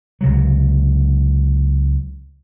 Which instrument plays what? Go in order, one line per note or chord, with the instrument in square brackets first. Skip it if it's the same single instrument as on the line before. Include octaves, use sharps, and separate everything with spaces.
[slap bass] C#2 C3 F#3